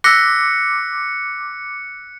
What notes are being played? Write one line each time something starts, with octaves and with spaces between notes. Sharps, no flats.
D6 E6 F#6 A#6 B6 C#7